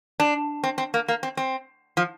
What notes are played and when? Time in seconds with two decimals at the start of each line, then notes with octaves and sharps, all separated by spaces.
0.20 D4
0.64 C4
0.78 C4
0.94 A#3
1.08 A#3
1.23 C4
1.37 C4
1.97 F3